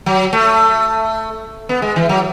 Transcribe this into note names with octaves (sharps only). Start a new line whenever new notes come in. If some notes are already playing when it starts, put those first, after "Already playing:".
F#3
A3
B3
G#3
E3
F#3